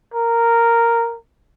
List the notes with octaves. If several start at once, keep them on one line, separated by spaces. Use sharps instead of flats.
A#4